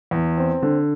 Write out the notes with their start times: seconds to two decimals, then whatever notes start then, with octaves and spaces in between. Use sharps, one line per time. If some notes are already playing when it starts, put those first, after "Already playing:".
0.11 E2
0.37 C4
0.62 D3